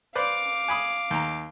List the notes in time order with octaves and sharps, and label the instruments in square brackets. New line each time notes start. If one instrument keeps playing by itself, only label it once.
[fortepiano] B4 C5 D5 [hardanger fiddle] F5 D6
[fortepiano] G#5 B5 D#6
D#2 A#5